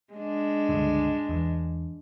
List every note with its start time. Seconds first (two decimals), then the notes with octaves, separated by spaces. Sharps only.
0.13 G#3 D4
0.69 C#2 G2 D3
1.29 E2